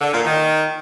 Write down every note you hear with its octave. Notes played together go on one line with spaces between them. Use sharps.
D3
A#2
D#3